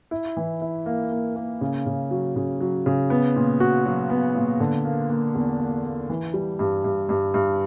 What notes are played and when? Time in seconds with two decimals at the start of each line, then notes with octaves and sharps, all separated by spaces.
0.11 E4
0.37 E3
0.62 E4
0.86 A#3
1.11 A#3
1.36 A#3
1.61 C#3
1.86 C#3
2.11 F#3
2.36 C#3
2.60 F#3
2.86 C#3
3.10 B3
3.36 A#2
3.60 F#4
3.85 F#3
4.10 B3
4.35 A#2
4.60 D3
4.85 A#3
5.10 A#3
5.35 E2
5.60 A#3
5.84 A#3
6.09 E3
6.34 G3
6.59 G2
6.84 G2
7.09 G2
7.34 G2